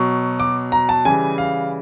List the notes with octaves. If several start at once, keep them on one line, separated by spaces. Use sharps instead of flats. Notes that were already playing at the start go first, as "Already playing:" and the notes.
Already playing: B2 F#3 C#6
D6
A#5
A5
C#3 E3 G3 G#5
F5